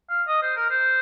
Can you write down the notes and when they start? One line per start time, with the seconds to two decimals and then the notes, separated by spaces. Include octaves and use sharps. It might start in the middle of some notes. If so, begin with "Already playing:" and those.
0.10 F5
0.28 D#5
0.42 C5
0.56 A#4
0.70 C5